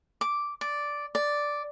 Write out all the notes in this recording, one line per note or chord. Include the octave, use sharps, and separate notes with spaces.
D6
D5
D5